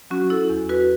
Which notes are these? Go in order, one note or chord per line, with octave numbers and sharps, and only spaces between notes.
F#3 C#4 F#4
E4 A4
E2
F#4 B4